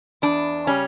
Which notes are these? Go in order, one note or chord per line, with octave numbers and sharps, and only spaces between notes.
E2 D4
C#3 G3 C#4